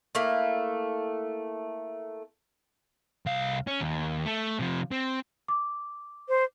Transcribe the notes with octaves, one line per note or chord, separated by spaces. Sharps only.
A3 A#3 E4
C2 F5
C#4
D#2
A3
C3 F3
C4
D6
C5